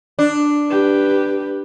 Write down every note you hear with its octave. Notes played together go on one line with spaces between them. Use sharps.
D4
G4 B4